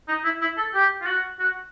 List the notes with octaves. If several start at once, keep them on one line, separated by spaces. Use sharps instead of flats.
D#4
E4
E4
A4
G4
F4
F#4
F#4